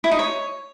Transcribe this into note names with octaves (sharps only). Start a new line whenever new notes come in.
E4
D#4
C#5